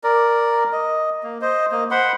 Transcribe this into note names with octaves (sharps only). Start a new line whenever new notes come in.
A#4 D5
D#5
A#3
C5 D#5
A#3 D#5
C5 F#5 B5 C6